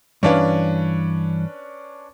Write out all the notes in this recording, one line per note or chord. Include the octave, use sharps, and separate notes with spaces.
G2 E3 C#4 D4 B4 F5